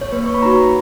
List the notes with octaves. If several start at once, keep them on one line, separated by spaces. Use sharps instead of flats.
C#5
A#3 B4
C#6
B5
D#4 F#4 A#5